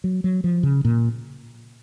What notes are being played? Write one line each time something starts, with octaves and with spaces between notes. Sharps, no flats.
F#3
F#3
F3
C#3
A#2